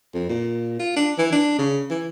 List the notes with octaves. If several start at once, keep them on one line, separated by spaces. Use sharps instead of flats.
F2
A#2
F4
D4
E3
D4
C#3
E3